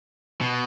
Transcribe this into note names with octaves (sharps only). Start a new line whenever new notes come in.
B2